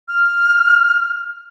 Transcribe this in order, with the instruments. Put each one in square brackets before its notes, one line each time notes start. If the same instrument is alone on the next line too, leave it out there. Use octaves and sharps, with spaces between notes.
[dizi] F6